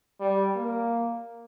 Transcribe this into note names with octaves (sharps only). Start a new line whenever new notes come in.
G3
A#3